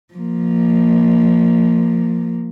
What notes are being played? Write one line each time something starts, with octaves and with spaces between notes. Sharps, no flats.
F3 A#3